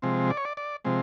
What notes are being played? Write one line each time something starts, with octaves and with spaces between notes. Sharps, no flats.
C3 F3 G#3 C4
D5
C#5
D5
D5
C3 F3 G#3 C4